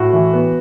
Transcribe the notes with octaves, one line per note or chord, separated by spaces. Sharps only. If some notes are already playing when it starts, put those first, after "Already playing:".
Already playing: A2 F#4
E3
B3